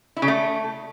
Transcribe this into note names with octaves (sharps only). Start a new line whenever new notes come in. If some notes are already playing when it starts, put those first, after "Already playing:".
E4
C#3
A3